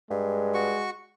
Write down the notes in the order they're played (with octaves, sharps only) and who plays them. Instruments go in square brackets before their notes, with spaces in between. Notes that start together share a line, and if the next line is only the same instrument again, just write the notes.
[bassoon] G2 [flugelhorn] G#3
[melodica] F#4 C#6